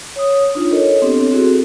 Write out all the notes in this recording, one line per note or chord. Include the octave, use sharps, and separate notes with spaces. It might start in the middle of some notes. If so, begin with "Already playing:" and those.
C#5 D#6
D4 D#4 F4
A4 A#4 C#5 D#5
B3 C4 D4 G4 A4
C4 E4 F#4 G#4 A4